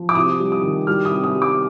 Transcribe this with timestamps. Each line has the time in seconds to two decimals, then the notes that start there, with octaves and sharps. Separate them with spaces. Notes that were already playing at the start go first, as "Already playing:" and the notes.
Already playing: F3
0.09 D6
0.15 C3 D#6
0.40 G3
0.52 D#6
0.63 D#3
0.87 G3 F6
1.05 D#6
1.11 C3
1.24 D#6
1.35 G3
1.42 D6